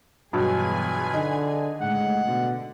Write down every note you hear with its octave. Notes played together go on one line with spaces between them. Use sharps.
E2 G2 B2 F#3 F4 G#4 B4 G#5
D3 D#4
C#2 A2 G#3 F#5
B2 D3